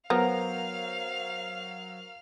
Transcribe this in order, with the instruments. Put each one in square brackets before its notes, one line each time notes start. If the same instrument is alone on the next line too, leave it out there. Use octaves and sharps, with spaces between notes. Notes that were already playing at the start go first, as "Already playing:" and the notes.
[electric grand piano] F#3 C5 [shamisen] B3 [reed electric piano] A#4 [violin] F5 F6